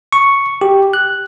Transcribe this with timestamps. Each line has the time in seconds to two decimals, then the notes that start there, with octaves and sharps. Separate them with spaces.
0.12 C#6
0.61 G4
0.93 F#6